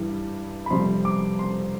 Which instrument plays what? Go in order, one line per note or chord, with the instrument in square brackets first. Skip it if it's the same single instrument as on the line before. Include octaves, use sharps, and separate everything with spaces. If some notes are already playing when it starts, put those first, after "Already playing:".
Already playing: [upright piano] G2 E3 G3
B5
F2 C3 G3 C6
D6
C6